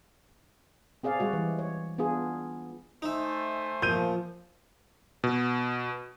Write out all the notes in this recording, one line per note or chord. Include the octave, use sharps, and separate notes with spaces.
C4 G#4 D5 F5
G3 G#3 F#4 D5
E3
C#5
B3 D4 F4 G#4
A3 D#4 C5 E5 G#5
A#2 F3 G6 D#7
B2